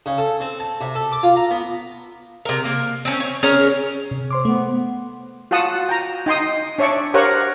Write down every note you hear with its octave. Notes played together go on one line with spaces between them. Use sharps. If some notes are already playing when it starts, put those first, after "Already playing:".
C#3
A4
C4
A5
C3
A4
D6
F4
A#5
B3
C3 A#4
A#3
C4 C#4
C#5
C#4 G#4 A#4 C#5
C3
C5 C6 D6
A3 B3
F4 F#4 F#5 A5 D#6
G5 A#5
D#4 G5 C6 D#6
D4 C#5 D5 E5 C#6
G4 A#4 C5 C#5 F5 F#5